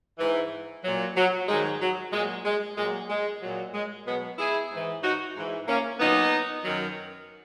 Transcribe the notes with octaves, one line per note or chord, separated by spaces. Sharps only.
G#2 E3
A#2 F#3
F#3
G#2 D#3 F#3 G#3
F#3
A#2 F#3 G#3
G#3
A#2 F#3 G#3
G#3
A#2 F#3
G#3
B2 F#3 G#3 B3
E4 G#4
G#2 E3
D#4 F#4
G#2 E3
A#3 C#4
A#2 F#3 B3 D#4
F#2 D#3 F#3